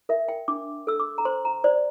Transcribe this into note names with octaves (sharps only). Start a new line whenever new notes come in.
A#4 E5
G5
D4 D6
A4 E6
D6
A#5
C5 C6
A#5
C5 D5